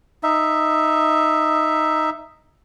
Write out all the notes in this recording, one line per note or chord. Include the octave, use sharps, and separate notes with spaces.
D#4 E5